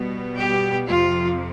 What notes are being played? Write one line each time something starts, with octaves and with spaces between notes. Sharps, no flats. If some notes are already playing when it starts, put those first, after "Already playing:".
Already playing: B2 G3 B3
G4
F2 C3 F3 F4